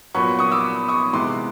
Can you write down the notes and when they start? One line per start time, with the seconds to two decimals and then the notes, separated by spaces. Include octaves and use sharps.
0.15 A#2 F#3 B3 B5 C#6
0.39 C#6 D#6
0.51 D6 E6
0.88 C#6 D#6
1.13 C3 E3 G#3 B3 C6 D6